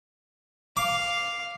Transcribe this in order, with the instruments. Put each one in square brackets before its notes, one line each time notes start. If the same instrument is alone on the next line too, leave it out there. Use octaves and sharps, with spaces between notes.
[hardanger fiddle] F5 [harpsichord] D6